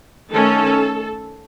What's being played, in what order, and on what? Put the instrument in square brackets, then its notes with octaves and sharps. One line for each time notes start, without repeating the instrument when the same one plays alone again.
[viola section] D#3 A3 C#4 A4